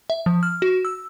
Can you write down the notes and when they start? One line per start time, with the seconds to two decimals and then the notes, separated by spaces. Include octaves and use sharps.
0.10 E5
0.26 F3
0.43 F6
0.62 F#4
0.85 E6